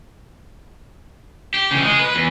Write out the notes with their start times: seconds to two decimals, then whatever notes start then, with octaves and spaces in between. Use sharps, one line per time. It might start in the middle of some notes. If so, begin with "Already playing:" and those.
1.54 G4
1.71 C#3 E3
1.84 G#3
1.99 B4
2.15 E2